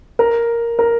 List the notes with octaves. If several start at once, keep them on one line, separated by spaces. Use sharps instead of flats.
A#4
A#4